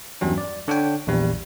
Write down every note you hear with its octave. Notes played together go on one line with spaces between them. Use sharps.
E2 G2 F#3 C#4
D5
D3 D4 C#5 G5
A#1 E2 G3